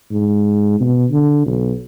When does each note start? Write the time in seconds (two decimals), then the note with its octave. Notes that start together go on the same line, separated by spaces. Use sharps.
0.11 G#2
0.80 B2
1.11 D3
1.46 B1